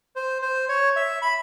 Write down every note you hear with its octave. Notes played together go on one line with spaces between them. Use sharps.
C5
C5
C#5
E5
B5